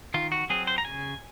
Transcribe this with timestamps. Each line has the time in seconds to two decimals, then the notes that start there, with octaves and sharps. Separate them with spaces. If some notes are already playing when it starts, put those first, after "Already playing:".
0.14 D#3 F4
0.32 F#4
0.50 F#3 C4 G#4
0.67 C5
0.78 A#5
0.85 C#3 G#5